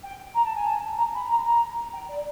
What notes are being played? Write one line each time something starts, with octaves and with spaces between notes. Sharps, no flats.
G5
A#5
A5
G#5
A5
A#5
B5
A#5
A#5
G5
D5